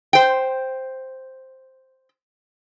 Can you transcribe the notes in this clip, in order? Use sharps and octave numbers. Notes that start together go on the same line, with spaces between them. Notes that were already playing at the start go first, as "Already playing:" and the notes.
C5 G5